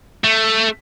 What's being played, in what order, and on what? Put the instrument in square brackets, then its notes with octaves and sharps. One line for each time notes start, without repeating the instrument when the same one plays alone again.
[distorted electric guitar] A3